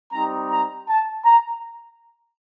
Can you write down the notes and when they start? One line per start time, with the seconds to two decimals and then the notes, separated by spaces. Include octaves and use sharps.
0.13 G3 C4 D#4 A#5
0.50 A#5
0.88 A5
1.25 A#5